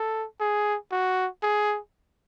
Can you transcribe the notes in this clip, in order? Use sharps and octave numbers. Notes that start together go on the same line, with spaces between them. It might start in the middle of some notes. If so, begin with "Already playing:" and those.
Already playing: A4
G#4
F#4
G#4